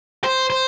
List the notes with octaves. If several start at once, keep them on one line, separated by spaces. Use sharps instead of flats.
C5
C5